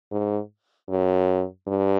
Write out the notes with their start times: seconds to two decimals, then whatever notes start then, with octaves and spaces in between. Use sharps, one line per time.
0.12 G#2
0.89 F#2
1.67 G2